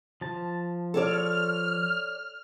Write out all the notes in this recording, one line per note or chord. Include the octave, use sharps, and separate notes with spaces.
F3 A5
A4 C#5 D5 F6